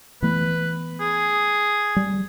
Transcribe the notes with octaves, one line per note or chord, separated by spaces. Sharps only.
E3 A3 B3 B4
G#4
G3